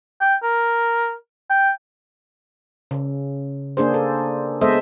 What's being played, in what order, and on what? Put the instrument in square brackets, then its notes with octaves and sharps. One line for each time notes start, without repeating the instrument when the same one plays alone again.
[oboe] G5
A#4
G5
[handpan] C#3
A#3 D4 G#4 C5
A4
G#3 B3 A4 C5 D#5 E5